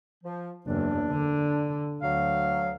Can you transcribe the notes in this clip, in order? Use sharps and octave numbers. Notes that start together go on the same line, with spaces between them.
F3
F#1 E2 D4
D3
D2 F#3 F5